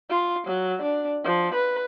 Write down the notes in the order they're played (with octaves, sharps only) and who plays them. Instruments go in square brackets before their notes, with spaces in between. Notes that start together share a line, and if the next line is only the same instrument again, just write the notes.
[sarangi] F4
F#3
D4
F3
B4